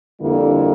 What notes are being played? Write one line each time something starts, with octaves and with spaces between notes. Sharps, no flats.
F2 D3 G3 A#3 E4